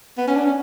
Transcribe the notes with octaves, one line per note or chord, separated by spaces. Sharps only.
B3
C#4
D4
C#4